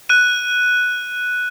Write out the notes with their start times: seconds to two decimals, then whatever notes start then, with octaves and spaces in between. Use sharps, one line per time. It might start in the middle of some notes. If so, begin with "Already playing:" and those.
0.09 F#6 D#7